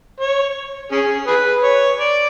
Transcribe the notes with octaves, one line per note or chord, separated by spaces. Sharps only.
C#5
C#4 G#4
G#4 B4
C#5
D5